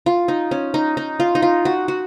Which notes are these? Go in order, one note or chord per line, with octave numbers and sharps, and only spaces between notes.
F4
D#4
C#4
D#4
D#4
F4
D#4
F4
F#4
F#4